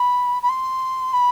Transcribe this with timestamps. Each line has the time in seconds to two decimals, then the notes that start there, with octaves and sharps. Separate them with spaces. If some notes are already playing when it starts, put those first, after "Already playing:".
Already playing: B5
0.43 B5
0.49 C6
1.13 B5